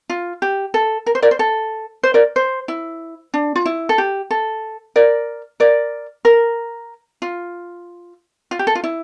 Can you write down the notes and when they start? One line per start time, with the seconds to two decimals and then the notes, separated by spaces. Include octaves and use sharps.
0.10 F4
0.42 G4
0.74 A4
1.06 A#4
1.15 C5
1.22 A#4 D5
1.31 C5
1.39 A4
2.03 C5
2.14 A#4 D5
2.36 C5
2.68 E4
3.34 D4
3.56 F4
3.65 E4
3.89 A4
3.98 G4
4.31 A4
4.96 A#4 D5
5.60 A#4 D5
6.25 A#4
7.22 F4
8.51 F4
8.59 G4
8.67 A4
8.75 F4
8.84 E4